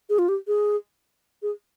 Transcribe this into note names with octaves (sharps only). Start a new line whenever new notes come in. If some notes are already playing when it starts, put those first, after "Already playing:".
G#4
F4
G4
G#4
G#4